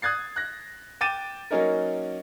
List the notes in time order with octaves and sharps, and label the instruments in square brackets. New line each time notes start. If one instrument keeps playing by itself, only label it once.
[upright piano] D#6 F#6 G#6 A6 C7
F#6 A#6
G5 D6 A6 D#7 E7
F#3 A#3 C#4 D#4 A#4